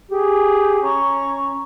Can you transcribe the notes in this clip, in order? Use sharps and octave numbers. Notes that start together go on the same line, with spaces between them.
G4 G#4
C#4 A#5 C#6